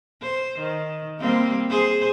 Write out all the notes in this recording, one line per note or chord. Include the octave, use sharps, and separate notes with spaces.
C5
D#3
G3 A#3 C4
G#4 C5